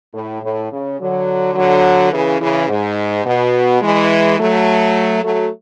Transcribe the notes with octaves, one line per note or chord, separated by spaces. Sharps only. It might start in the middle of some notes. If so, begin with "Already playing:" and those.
A2
A2
C#3
D3 F#3
D3 F#3
C#3 E3
C#3 E3
G#2
B2
E3 G#3
F#3 A3
F#3 A3